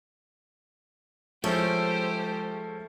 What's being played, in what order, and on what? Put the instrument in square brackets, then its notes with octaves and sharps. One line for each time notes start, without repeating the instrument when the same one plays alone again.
[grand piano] F3 C#4 E4 [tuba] G#3 [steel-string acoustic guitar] A3 [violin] G4 C5